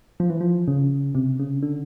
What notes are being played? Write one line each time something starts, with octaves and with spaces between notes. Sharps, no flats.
F3
E3
F3
C#3
C3
C#3
D3